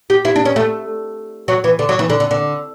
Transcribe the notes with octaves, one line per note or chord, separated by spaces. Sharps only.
G4
E4
D4
C#4
A3
F#3
E3
D3
F#3
E3
D3
D3
D3